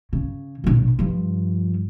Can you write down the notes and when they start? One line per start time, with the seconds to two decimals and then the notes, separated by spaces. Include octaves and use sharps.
0.13 C#3
0.64 A#1 B2
0.99 G2 F3